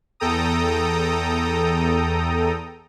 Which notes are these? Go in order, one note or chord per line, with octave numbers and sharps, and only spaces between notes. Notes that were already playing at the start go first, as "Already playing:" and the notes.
E2 A4 G5 A#5 D#6